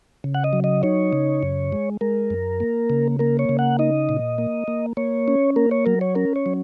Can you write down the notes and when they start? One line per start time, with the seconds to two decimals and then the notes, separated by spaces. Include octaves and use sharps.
0.24 C#3
0.35 F#5
0.44 D#5
0.53 F#3
0.64 D#5
0.83 D#4 C#5
1.13 C#3
1.43 F#2
1.72 G#3
2.01 G#3 A#4
2.30 F#2
2.60 A#3
2.90 C#3
3.19 A#3 A#4
3.39 C#5
3.49 C#3
3.59 F#5
3.79 D#4 D#5
4.09 A#2
4.38 A#3
4.68 A#3
4.97 A#3 C#5
5.28 C#4
5.56 A#3 A#4
5.71 C#5
5.86 F#3 A#4
6.01 C#5
6.15 C#4 A#4
6.36 C#5
6.46 F#3